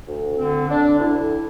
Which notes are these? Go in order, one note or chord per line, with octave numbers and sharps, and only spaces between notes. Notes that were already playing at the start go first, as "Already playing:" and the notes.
D2
D3 C4
D3 D4
D2 E4